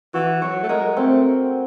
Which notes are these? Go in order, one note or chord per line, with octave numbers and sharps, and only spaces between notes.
E3 F#4
F#3 C#5
A3
G#3 A#4
A3 C4